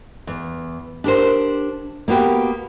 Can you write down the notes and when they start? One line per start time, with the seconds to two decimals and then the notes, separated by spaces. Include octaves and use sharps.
0.27 E2
1.04 D4 G4 A#4 C5
2.08 A#3 B3 F#4 G4